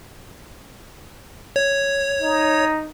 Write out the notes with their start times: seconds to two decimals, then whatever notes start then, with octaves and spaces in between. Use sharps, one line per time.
1.56 C#5
2.21 D#4